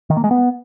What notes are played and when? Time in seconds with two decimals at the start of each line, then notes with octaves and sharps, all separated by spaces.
0.10 D#3
0.17 A#3
0.24 G#3
0.31 B3